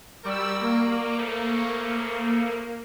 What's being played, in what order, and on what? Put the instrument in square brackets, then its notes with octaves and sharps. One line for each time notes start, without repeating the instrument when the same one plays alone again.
[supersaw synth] G3 E6 [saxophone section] F#4 A#4 D5
[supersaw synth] A#3
[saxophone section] C#3 F3 A3